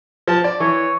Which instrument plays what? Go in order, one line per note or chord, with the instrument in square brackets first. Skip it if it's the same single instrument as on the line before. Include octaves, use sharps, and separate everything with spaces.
[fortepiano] F3 A5
D5
[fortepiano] E3 [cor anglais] C#5